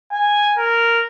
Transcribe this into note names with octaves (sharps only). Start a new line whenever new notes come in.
G#5
A#4